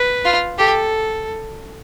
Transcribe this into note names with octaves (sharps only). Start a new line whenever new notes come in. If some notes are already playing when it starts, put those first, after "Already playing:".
Already playing: B4
F4
G4 A4